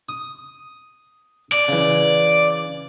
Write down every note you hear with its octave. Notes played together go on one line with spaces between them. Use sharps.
D#6
D5 A5
C#3 E3